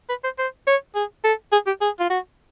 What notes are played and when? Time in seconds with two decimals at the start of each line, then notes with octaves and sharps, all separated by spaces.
0.09 B4
0.24 C5
0.39 C5
0.67 C#5
0.95 G#4
1.24 A4
1.53 G#4
1.67 G4
1.81 G#4
2.00 F4
2.10 F#4